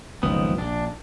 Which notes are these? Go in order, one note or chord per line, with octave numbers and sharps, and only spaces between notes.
F#1 C#2 D#3 F3 B3
A#1 D4